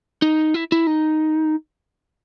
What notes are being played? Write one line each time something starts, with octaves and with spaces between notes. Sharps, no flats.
D#4
E4
E4
D#4